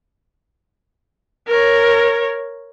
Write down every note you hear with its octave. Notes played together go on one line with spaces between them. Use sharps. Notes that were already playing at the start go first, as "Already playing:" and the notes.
A#4 C#5